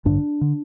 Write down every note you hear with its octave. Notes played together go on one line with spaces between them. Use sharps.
A1 G2 D3 D4
D3